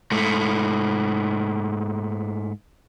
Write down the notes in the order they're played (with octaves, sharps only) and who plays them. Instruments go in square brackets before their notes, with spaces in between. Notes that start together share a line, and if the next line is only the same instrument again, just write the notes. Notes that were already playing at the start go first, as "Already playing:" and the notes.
[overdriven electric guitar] G#2 A3